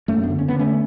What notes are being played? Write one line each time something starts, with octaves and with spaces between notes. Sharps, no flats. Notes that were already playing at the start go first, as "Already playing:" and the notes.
F#2 A3 C#4
B3 D4
D3
C#4
D3 B3
A3 C#4